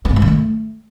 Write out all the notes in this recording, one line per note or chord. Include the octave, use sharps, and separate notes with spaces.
B3
G#2
G#3
D#3
A3